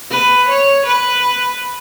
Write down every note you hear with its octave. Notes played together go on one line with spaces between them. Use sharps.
B4
C#5
B4